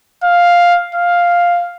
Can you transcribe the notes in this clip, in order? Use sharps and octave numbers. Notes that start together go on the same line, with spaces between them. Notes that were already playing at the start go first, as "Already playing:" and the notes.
F5
F5